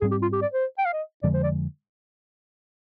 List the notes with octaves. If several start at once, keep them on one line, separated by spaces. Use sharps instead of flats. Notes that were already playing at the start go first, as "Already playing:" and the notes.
G#2 G3 C4 G#4
G4
F4
G4
D5
C5
G5
F5
D#5
F2 D3 F3 G#3 D5
C5
D5